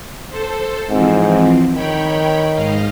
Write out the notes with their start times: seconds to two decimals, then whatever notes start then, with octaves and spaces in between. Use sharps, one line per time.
0.30 A4 C5
0.89 G#2 E3 F3 C4
1.74 D#3 C#5 G5 B5
2.53 G#2 D#5 F5